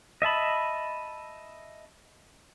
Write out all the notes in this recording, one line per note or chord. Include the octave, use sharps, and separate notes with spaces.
D#5 E5 A5 B5